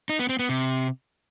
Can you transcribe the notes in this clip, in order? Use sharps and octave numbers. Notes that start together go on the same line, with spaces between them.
D#4
B3
C4
B3
C3